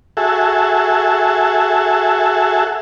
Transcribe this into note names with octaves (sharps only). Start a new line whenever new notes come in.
F#4 G#4 A4 E5